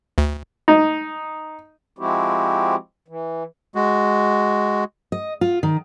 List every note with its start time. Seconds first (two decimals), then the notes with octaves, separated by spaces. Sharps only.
0.18 D2
0.68 D#4
1.99 F3 G#3 C4 E4 F#4 G4
3.08 E3
3.75 G#3 F#4
5.12 D#5
5.41 F4
5.63 D#3